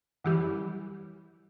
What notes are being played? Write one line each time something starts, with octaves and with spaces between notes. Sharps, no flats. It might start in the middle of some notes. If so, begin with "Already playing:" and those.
F#2 E3 G3